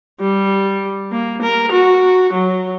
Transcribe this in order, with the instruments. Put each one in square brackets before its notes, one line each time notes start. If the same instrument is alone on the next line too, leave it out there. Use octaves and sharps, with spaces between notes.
[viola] G3
A#3
A#4
F#4
F#3